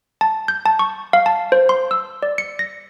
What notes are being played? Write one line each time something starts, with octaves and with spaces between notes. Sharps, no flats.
A5
G6
A5
C#6
F5
A5
C5
C6
E6
D5
C#7
A#6